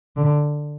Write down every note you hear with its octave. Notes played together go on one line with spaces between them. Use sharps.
D3